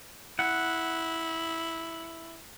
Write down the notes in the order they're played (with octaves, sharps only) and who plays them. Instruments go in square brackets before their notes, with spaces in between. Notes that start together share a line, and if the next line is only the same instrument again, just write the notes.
[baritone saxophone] E4 [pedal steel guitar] F#5